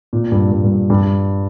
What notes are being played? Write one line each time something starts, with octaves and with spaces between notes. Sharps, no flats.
A#2
G2
G2
G2
G2